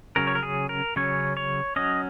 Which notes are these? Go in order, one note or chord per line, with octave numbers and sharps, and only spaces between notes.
C#3 F#3 C#4 A#4
C#5
A#4
G#4
A#4
C#3 F#3 C#4 C#5
C#5
F#3 C#4 D#5